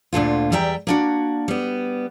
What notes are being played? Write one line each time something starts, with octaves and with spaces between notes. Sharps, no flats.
D2 A#2 D3 F4
E2 G3 E5 G5 A#5
A#3 D4 F#4
G3 B3